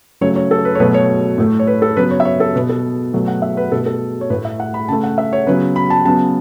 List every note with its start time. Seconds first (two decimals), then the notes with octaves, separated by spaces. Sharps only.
0.21 C#3 F#3 A3 C#5
0.36 C#5
0.51 A4
0.65 B4
0.75 C#5
0.80 B2 F#3 A3 B4
0.94 C#5
1.38 A2 A3
1.59 C#5
1.67 B4
1.82 A4
1.96 C#3 F#3 B3 B4
2.11 C#5
2.20 E5
2.25 C#5
2.40 A4
2.55 B2 B3 B4
2.69 A4
3.13 B2 F#3 A3
3.28 F#5
3.42 E5
3.57 B4
3.72 B2 A3 A4
3.86 A4
4.21 C#5
4.30 A2 B4
4.34 A3
4.45 E5
4.60 F#5
4.74 B5
4.88 C#3 A3 A5
5.03 F#5
5.18 E5
5.33 C#5
5.47 C#3 F#3 B3 B4
5.76 B5
5.90 A5
6.05 C#3 F#3 B3 A5